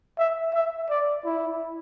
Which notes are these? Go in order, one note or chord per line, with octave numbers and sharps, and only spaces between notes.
E5
E5
D5
E4